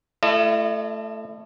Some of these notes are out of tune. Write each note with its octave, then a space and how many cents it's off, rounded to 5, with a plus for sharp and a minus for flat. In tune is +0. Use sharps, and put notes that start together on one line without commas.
A3 +0 E4 +40 D#5 -40